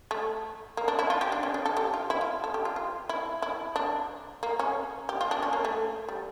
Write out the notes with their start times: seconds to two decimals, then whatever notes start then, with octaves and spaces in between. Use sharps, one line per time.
0.11 A3
0.77 A#3
0.88 D4
0.99 E4
1.10 F4
1.21 G4
1.32 D4
1.43 C#4
1.54 D4
1.65 A4
1.77 G4
1.94 F4
2.10 E4
2.21 F4
2.44 A4
2.54 G4
2.65 F4
2.76 F4
3.09 E4
3.42 E4
3.76 D4
4.43 A#3
4.59 C#4
5.09 G4
5.21 F4
5.31 D4
5.42 C#4
5.53 A#3
5.65 A3
6.09 G3